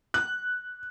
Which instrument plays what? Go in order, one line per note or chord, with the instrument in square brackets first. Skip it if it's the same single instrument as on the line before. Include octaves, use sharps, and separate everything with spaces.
[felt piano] F#6